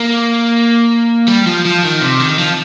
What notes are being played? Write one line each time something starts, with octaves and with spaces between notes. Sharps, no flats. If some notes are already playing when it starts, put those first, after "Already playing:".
Already playing: A#3
G3
F3
F3
D#3
C3
D#3
F3